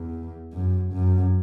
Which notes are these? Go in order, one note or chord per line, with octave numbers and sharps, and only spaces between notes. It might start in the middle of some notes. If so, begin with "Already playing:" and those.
Already playing: E2
F#2
F#2